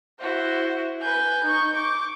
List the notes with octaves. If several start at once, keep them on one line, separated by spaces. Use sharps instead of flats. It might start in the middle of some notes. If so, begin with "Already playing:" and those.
E4 F#4 C5
B4 G#5 G6
D#4 C#6
C#6 D6